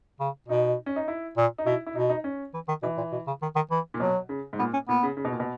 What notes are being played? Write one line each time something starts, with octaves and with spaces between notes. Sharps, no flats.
C#3
B2 D#4
C#4
D#4
E4
A#2
D#4
B2 E4
E4
B2 D#4
D#4
C#4
E3
D#3
B2 E3
A#2
B2
C#3
D#3
D#3
E3
A#2
B2 F#3
C#3
G#2
A#2 B3
C#4
A#2 B3
C#3
C#3
B2
A#2
B2